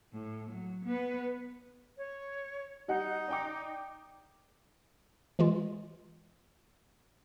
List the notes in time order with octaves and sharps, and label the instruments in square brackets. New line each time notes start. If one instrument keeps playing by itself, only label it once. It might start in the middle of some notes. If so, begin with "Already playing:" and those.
[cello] A2
F#3
B3 B4
[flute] C#5
[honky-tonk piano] G3 D#5 F#5 [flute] D#4
[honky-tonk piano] D5 G5 D6
[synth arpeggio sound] E3 G#3 F4